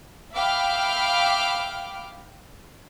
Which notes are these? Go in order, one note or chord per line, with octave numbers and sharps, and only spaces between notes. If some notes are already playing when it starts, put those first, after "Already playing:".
E5 F5 G5 B5 D6 F6